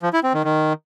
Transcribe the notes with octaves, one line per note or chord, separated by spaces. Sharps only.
F3
E4
C4
D#3
D#3